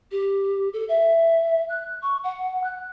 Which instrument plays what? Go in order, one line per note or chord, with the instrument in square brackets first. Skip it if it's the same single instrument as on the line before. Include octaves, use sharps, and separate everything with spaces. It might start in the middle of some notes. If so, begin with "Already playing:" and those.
[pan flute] G4
A4
E5
F#6
C#6
F#5
F#6